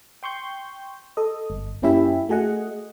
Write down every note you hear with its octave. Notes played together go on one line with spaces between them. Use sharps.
G5 C6 C#6 G6
A4 D#5
G1
F#2 A#3 C#4 E4 G4 E5
A3 F#4 G#4 D#5 F#5